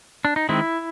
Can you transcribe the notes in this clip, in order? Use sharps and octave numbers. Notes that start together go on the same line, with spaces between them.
D4
D#4
D#3 G#3 C4 E4